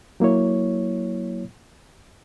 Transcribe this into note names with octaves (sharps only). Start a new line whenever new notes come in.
F#3 A#3 E4 C#5